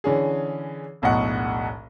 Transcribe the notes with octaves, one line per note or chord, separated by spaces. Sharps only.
D3 E3 C#4 G#4
E1 B1 A2 D#5 F#5 C#6